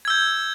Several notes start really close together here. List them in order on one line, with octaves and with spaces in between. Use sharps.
G#6 E6 G6